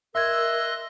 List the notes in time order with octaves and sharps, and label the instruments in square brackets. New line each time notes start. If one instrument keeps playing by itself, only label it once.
[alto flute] A#4 [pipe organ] D#5 C6 F#6 [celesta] E5 G#6 [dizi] E6